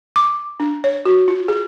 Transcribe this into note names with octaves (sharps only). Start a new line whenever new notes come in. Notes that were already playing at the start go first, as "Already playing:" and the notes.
D6
D4
C#5
F#4
F4
G#4